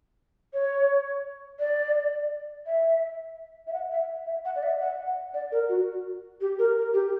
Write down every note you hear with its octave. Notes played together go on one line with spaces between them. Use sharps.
C#5
D5
E5
E5
F#5
E5
E5
F#5
D5
E5
F#5
F#5
D5
A#4
F#4
G4
A#4
A#4
G4